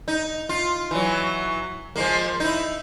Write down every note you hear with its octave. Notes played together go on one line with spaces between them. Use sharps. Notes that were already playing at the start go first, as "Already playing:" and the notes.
D#4
F4
E3 F#3
F3 G#3 A#3
D#4 E4